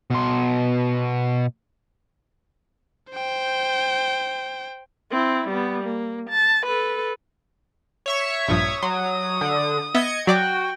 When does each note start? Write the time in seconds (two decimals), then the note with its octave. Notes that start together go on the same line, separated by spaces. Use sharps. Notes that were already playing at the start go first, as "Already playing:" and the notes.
0.10 B2 C6
3.11 C5 G5
5.11 C4 E4
5.48 G3 B3
5.83 A#3
6.30 A5
6.66 A4 B4
8.06 C#5 E5 C#6
8.48 A#1 G2 F3 D#6
8.82 F#3 C6 D#6
9.41 D3
9.94 B3 D#5 E5 G#6 C#7
10.27 F#3 F#4 D5 G5 D6